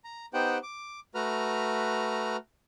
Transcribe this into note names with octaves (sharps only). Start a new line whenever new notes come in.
A#5
B3 D#4 G4 C5 F#5 G5
D6
A3 F#4 B4 A#5 F6